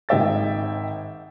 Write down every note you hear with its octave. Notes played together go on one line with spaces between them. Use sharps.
G#1 G#3 D#5 E5 G5 A6